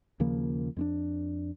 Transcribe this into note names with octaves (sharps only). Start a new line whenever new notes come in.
D#2 C#3 F3 A#3
F2 C4 D4